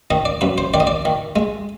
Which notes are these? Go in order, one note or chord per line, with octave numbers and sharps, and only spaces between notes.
D#3 D#5
D5
F#2 B4
C5
D#3 D5
D#5
D5
D#3
G#3